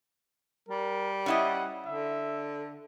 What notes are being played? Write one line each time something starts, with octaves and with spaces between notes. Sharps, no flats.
G3 A#4
C#4 E4 D#5 F#5
D3 E5